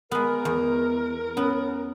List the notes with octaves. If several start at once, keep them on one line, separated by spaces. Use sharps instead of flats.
G#3 B3 A#4
E2
B3 C#4